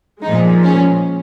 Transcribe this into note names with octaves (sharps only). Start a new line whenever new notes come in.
A#2 F3 G#3 D#4
C#4